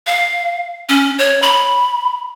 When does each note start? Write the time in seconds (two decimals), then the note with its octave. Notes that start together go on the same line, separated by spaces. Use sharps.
0.07 F5
0.89 C#4
1.19 C#5
1.42 B5